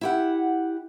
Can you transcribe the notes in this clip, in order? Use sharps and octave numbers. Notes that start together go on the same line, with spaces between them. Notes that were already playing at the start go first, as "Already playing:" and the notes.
E4 G4 F#5